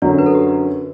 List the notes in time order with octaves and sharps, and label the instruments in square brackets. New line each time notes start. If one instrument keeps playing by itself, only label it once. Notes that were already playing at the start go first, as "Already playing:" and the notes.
[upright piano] F#2 D3 F#3 C#4 [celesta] D5
[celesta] B4
A4
G4